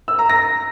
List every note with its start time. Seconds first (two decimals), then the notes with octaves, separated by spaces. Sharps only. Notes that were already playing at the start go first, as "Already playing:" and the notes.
0.08 E6
0.19 A#5
0.30 A#6